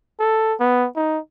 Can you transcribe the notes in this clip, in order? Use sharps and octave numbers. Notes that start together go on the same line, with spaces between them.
A4
B3
D#4